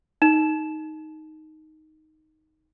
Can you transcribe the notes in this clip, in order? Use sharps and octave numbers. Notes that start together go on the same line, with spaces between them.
D#4 E7